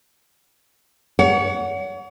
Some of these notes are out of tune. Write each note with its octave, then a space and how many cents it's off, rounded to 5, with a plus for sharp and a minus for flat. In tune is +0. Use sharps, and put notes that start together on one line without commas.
C#5 +35 F#5 -10